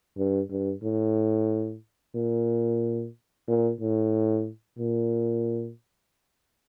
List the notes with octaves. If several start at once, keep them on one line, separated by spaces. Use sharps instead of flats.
G2
G2
A2
A#2
A#2
A2
A#2